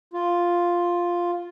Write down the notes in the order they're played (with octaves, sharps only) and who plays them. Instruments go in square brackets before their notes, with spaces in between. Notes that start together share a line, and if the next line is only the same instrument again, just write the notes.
[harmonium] F4